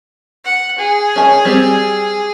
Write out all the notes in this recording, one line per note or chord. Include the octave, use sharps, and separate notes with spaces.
F#5
G#4
C#4 G4 G#5
G3 C4 G4